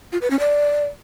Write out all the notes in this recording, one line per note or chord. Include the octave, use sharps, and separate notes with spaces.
F4
B4
C#4
D5